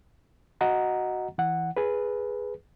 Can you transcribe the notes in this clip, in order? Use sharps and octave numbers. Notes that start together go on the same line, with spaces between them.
F#4 D#5 F#5 A#5
E3 F#5
G#4 B4